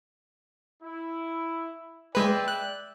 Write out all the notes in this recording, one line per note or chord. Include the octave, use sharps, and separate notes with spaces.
E4
G#3 B4 D5 E5 G5
F#6